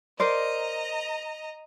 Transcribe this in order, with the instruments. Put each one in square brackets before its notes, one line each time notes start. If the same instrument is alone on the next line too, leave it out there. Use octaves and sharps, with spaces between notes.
[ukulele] A#4 C5 D5 [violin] D#5 A#5